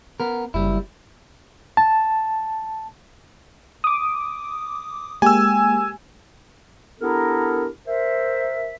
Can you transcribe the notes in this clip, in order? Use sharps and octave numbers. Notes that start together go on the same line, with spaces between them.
B3 A#4
F#1 G3 E4
A5
D6 D#6
G#3 A#3 G4 G#5 E6
B3 D4 E4 G4 A4 A#4
A#4 C5 E5